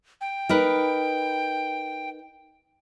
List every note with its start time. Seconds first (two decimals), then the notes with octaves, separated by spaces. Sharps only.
0.21 G5
0.49 D#4 A#4 B4